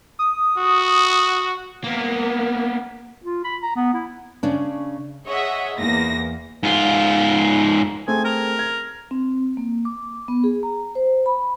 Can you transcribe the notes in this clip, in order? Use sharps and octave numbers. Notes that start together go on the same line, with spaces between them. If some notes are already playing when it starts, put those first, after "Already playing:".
D#6
F#4
A#3 B3
F4
B5
A#5
B3
E4
C#3 C#4 D4
G#4 C#5 D#5 E5 F#5
E2 A#3 A#6
G#2 F4
A3 C4 G#4 G#5
A#4
G#6
C4
A#3
D6
B3
G#4
A#5
C5
B5